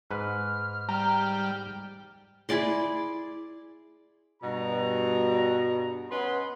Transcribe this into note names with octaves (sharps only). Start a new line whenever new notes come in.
G#2 B4 F6
G3 A#5
E4 G#4 D5 C6
G2 B2 A#5
B3 C#4 D#4 B4 B5 C6